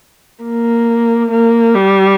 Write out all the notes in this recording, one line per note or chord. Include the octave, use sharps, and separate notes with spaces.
A#3
A#3
G3